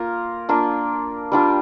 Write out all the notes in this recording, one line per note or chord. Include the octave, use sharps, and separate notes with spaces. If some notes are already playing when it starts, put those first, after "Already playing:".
Already playing: A#3 F4 A#4
A#3 D4 F4
G3 D4 F4